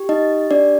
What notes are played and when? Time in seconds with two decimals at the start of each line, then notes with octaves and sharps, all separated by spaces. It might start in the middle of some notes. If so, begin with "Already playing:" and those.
Already playing: G4
0.09 D#4 D#5
0.51 D4 D5